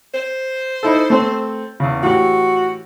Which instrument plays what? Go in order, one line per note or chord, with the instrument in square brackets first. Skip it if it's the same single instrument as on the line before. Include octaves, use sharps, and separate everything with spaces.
[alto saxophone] C5
[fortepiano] D#4 E4 A4
A3 C4
E2 C#3
[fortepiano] A2 E3 G4 [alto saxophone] F#4